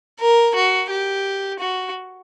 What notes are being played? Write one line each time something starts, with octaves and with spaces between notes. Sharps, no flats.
A#4
F#4
G4
F#4